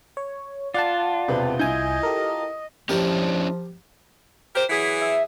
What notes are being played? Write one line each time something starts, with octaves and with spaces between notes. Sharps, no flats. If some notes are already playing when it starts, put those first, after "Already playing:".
C#5
F4 D5 F#5 A5
E1 C3 B4
C2 E4 D#5 G#5 G6
G4 A4 A#4
F3 C#4 D4 E4 G4 A#4 A5
G4 A#4 C5
E3 F#3 G#4 B6
E5